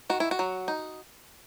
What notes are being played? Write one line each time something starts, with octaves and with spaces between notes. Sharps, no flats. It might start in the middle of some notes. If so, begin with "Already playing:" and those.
D#3 F#4
E4
F#4
F#3
D#4